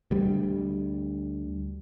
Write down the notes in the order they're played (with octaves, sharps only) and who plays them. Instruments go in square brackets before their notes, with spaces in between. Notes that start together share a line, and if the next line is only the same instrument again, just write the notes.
[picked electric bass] D2 G3